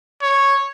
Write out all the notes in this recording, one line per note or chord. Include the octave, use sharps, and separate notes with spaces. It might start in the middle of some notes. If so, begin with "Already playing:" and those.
C#5